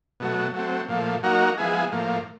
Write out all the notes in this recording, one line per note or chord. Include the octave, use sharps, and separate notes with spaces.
B2 F#3 A3
F#3 A3 C4
A#2 F3 A3
F#3 A#3 D#4 F#4 A#4
F3 G#3 B3 E4 G#4
A2 F3 A#3